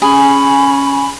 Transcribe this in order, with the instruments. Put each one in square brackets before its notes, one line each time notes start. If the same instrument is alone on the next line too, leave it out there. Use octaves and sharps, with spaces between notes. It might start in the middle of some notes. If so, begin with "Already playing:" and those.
[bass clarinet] C#4 [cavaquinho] G#4 [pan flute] B5